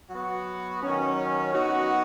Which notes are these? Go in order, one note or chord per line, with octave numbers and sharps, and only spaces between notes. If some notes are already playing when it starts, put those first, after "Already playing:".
F#3 B3 F#4
D#3 F#3 C#4
F#3 B3 D#4 F#4